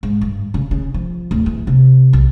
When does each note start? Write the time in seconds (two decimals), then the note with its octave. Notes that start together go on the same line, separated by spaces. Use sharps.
0.03 G#2
0.21 G2
0.54 C#3
0.71 C#3
0.94 F3
1.31 D1
1.46 E3
1.67 C3
2.13 B1